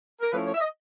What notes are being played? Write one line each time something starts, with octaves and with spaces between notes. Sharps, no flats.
A#4
F3 A3 C#4 E4 B4
C#5
E5
D#5